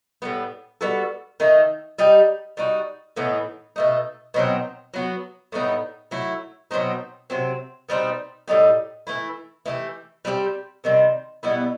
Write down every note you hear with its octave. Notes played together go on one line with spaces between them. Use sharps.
A2 G3 B3
G3 B3 F#4 A4
D#3 A3 D#4
G3 D#4 G4
G3 D#4 F#4
A2 E3 B3 D#4
B2 A3 D#4
B2 F#3 C4 D#4
F#3 B3 F#4
A2 G3 B3 D#4
F#3 A3 E4
B2 F#3 C4 D#4
C3 F#3 C4
B2 G3 C4 D#4
A2 G3 D#4 G4
E3 A3 E4
E3 A3 D#4 G4
G3 C4 D#4 G4
C3 D#3 G3 C4
B2 G3 B3 E4